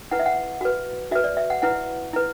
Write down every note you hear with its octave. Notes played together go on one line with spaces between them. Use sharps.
E4 B4 F#5
E5
F#5
F#4 B4
F#4 B4 E5
D5
E5
F#5
E4 B4 F#5
E4 B4